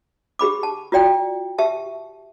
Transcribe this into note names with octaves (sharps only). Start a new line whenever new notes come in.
G4 G#4 B5 D6
A5
F4 F#4 D5 G5
G4 E5 A5